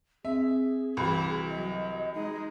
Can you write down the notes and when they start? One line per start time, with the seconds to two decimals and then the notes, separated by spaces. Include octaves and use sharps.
0.25 C4 G#4 E5
0.97 C2 E3 E4 F#4 B5
1.49 F#3 D#5
2.14 G#3 D#4